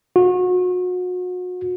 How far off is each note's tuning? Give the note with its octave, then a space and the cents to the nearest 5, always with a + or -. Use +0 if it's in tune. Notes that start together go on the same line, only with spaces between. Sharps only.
F#4 -35